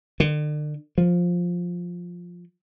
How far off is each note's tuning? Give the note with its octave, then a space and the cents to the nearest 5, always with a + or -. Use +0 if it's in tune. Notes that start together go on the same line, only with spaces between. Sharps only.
D3 +40
F3 +10